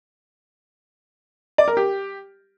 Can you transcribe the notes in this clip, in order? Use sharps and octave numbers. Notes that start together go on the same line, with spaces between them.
D5
A#4
G4